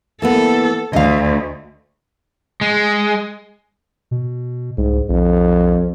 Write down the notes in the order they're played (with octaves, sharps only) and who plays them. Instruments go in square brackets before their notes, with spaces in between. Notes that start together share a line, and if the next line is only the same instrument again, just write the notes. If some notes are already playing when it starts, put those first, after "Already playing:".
[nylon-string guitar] E3 A#3 B3 [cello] A4
[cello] D2 [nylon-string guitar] D#5 F5
[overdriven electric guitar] G#3
[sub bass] B2
[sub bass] C2 [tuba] G#2
[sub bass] B1 [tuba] F2